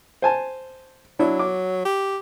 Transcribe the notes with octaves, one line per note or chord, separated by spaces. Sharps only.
C5 G#5 A5
F#3 D4 E4
D6
G4